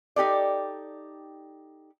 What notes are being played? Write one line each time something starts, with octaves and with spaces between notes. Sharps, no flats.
D#4 G4 A4 D5